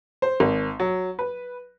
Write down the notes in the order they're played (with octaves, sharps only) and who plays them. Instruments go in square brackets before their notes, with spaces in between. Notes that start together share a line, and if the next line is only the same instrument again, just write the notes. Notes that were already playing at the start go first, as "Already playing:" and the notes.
[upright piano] C5
G#1
F#3
B4